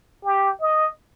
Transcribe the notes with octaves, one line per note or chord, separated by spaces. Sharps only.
G4
D#5